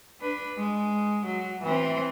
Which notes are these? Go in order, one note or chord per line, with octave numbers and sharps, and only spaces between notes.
D4 B4
G#3
F#3
E3 C4